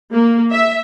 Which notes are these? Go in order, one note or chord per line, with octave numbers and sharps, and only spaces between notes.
A#3
E5